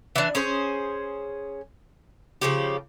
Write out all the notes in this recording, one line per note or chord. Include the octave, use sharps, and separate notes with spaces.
E3 D4
C#4 G#4 C5
C#3 F3 G4